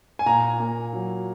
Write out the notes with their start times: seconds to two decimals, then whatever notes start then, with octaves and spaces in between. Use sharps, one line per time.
0.19 G#5
0.26 A#2 A#5
0.60 A#3
0.93 F#3